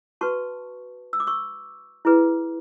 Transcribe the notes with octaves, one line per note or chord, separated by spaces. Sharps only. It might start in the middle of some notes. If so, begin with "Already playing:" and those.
F#4 B4 A5 C#6
E6
D6
C#6 E6
E4 G#4 B4